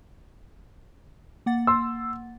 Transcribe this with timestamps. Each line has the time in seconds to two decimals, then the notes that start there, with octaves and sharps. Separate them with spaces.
1.46 A#3 F#5 A6
1.67 C6 E6